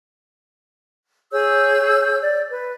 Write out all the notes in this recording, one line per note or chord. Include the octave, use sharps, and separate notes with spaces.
G#4 C#5 E6 G6
D5
B4